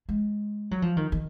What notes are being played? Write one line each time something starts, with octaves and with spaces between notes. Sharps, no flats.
G#3
F#3
F3
D#3
D#3